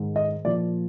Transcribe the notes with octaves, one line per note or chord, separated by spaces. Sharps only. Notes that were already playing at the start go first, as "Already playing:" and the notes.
Already playing: G#2 D#3
D#5
A#2 F3 D5